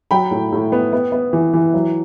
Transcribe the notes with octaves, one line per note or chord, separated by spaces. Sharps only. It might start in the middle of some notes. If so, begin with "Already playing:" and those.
F#3 G5 B5
A2
A2
B3
B3
B3
E3
E3
F#3